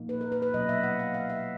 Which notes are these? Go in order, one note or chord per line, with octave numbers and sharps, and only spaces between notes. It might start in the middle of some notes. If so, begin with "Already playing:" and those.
Already playing: A#2 F3 A#3 D#4
B4
A#4
B4
B4
B2 F#3 A#3 C#4 D#5
E5
F#5
F5
F5
E5